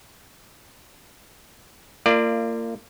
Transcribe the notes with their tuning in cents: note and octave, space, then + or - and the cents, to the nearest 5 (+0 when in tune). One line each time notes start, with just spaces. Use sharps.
A#3 -30 F4 -30 D5 +15